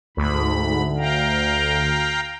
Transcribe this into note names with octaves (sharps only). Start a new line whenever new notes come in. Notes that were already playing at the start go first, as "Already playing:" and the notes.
D2 G#2 B5
F5 G5 A#5